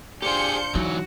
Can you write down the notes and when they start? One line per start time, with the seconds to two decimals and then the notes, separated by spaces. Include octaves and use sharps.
0.22 D4 F4 G4 G#4 C5 G6 C#7
0.75 E3 F#3 D#4 F#4